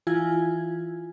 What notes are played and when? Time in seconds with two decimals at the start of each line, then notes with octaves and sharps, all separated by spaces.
0.07 E3 E4 F4 G#5 G#6